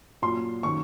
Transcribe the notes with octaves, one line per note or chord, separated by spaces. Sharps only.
A#2 F#3 C6
D#3 F#3 C#6